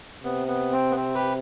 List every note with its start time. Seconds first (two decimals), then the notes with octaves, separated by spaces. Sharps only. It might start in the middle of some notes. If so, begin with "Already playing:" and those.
0.23 C3 B3
0.48 B3
0.72 C4
0.91 B3
0.97 C4
1.14 G4 B4